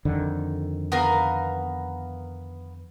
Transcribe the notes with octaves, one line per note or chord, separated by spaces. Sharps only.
F2 D3 D#3
B3 A#4 F5